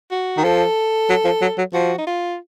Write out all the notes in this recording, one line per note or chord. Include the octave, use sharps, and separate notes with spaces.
F#4
D#3
F3 A4
F#3
F3
F#3
F#3
F3 F#4
D#4
F4